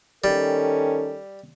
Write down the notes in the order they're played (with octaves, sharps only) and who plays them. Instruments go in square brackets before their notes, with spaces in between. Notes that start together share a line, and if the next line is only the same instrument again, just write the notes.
[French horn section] D#3 C#4 A4 [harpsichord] G3